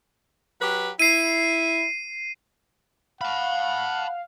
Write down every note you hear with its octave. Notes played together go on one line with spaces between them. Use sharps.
F#3 G4 B4
E4 C7 D#7
F5 F#5 A5 B5